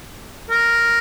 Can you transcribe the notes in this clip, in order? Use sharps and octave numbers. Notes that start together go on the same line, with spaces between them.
A#4